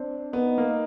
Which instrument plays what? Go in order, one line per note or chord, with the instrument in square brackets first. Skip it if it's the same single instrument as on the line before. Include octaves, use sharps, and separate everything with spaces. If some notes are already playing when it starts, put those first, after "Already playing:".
Already playing: [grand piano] C4 [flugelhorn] D4
[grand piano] B3 [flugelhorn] D#4
[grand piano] A#3